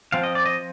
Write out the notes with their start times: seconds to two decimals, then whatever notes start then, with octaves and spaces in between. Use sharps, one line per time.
0.12 F3 C4 F5
0.23 D#5
0.35 D5
0.46 D#5